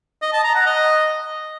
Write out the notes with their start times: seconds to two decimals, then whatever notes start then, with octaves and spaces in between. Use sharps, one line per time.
0.22 D#5
0.33 A5
0.44 A#5
0.55 F#5
0.66 D#5